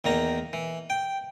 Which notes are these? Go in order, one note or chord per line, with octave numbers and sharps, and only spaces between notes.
E2 D#3 A#3 A#5
E3
G5